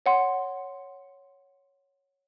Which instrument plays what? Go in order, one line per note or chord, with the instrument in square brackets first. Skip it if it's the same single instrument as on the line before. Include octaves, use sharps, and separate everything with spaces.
[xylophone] C#5 F#5 C6